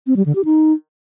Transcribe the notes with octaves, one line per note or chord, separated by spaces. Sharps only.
C4
G3
D3
G4
D#4